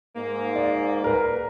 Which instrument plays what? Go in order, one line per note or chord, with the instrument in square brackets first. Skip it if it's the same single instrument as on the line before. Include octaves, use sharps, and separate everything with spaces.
[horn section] G#2 A#3
[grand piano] D5
A#4 B4